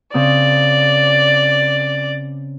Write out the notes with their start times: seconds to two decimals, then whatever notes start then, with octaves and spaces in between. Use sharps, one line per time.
0.14 C#3 C4 D5 D#6